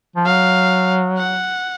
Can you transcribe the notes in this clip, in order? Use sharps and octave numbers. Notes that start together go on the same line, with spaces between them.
F3
F#3 F5
F#5